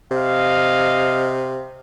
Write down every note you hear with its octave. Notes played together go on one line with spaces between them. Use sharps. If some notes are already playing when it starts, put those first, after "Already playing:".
C3 D#5 F5